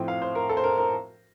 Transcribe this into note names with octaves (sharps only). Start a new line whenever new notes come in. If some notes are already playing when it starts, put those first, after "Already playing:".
Already playing: A2 F3 C4 G5
F5
C5
A#4
A4
C5
A#4
A#4